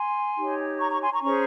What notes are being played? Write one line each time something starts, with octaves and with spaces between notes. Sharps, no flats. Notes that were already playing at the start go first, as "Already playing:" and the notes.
Already playing: G#5 C6
D#4 G4 C#5
A#5 C#6
A#5 C#6
G#5 C6
A#5 C#6
C#4 G#4 C5 A#5 C#6